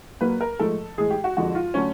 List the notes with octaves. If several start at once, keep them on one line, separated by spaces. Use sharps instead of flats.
A#2 F#3 A#3 B4
A#4
G#2 F3 A3 A4
A2 E3 G#3 G#4
G4
F#4
F2 D3 F3 G#3 F#4
F4
D3 F#3 A3 C#4